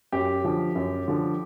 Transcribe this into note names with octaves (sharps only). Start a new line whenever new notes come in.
F#2 G4
D3 F3
F#2
D3 F3